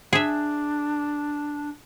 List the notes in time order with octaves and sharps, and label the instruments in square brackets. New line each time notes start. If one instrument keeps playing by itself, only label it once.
[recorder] D4 [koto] G#4 E5